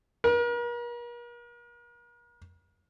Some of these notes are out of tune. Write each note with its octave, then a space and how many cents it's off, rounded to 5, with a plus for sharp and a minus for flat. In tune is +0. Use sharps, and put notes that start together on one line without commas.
A#4 +45